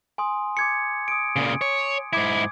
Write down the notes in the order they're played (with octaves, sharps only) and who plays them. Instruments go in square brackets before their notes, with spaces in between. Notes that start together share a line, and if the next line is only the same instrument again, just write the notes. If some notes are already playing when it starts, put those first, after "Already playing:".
[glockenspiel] G#5 C6 D#6
D6 G#6 C#7
D#6 D7
[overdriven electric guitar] A#2 C#3
C#5
[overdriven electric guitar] G#2 E4 [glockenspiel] D6 G#6